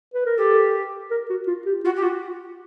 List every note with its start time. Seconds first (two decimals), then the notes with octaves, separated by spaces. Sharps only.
0.14 B4
0.26 A#4
0.37 G4 A4
1.11 A#4
1.30 F#4
1.47 F4
1.66 G4
1.84 F4 F#4
1.96 G4
2.02 F4 F#4